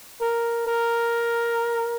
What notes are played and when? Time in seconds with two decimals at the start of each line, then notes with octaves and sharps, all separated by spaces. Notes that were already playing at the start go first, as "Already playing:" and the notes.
0.21 A#4
0.67 A#4